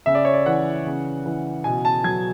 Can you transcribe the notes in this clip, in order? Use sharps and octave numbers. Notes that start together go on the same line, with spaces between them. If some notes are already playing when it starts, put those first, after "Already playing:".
C#3 E5
D5
C#5
D5
E3 F#5
C#3
E3
B2 G#5
A5
F#3 G#6